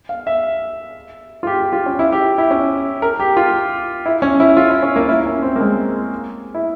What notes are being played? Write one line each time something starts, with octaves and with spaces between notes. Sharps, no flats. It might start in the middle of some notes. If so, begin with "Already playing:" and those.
F5
E5
F4
G4
G4
F4
C#4
E4
G4
E4
C#4
A#4
G4
F4
E4
C#4
E4
F4
E4
C#4
A#3
E4
C#4
C4
A#3
G#3
E4